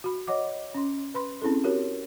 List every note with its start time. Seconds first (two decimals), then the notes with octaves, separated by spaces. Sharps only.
0.04 F#4 B5
0.27 C#5 D#5 F#5 D6
0.74 C#4 C6
1.14 B4 B5 C6
1.42 C4 C#4 E4 G#4 A4
1.64 F#4 G4 A#4 C#5